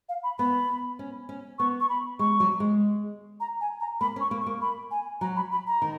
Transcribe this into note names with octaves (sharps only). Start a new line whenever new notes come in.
F5
B5
B3 B5
C#4
C#4
B3 C#6
C#6
B5
G#3 C#6
F#3
G#3
A#5
G#5
A#5
A#3 B5
C#4
C#6
A#3
C#6
A#3
B5
G#5
F#3 A#5
B5
B5
A#5
D#3